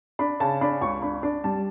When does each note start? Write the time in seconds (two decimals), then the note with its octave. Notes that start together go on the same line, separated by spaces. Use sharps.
0.19 D4 B5
0.40 C#3 A5
0.61 D4 B5
0.81 C#2 C#6
1.02 D4 B5
1.23 D4
1.44 G3 A5